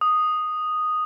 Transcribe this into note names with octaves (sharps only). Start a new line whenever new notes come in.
D#6